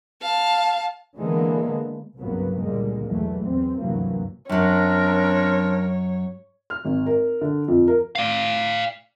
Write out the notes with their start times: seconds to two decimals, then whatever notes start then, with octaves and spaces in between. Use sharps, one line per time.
0.22 F5 A5
1.17 D3 E3 G#3 A#3 B3
2.18 C2 G2 C#3 F#3 A#3 B3
2.60 C#2 A#2 D3 G3 G#3 A#3
3.07 B1 E2 E3 F#3 A3
3.43 E2 C4
3.78 D2 G2 C3 E3 F#3 A#3
4.49 F#2 F#3 C4 D4 A#4 C#5
6.70 F6
6.85 G#1
7.06 A#4
7.41 D3
7.68 F2
7.88 A#4
8.15 D5 F5